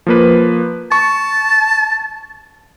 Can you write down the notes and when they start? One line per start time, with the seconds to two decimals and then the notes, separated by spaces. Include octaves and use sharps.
0.07 F3 A#3 B4
0.92 A5 C#6